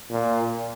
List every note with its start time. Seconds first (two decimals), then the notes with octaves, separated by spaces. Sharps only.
0.10 A#2